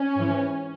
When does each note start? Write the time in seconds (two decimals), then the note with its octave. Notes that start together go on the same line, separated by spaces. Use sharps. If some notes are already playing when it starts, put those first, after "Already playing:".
Already playing: C#4
0.16 G#2 E3